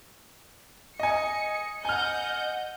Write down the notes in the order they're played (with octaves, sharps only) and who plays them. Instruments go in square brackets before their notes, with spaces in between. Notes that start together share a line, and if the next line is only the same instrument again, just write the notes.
[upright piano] D#5 G#5 [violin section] C#7
[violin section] D#5 F#5 G6 [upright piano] G#5 F6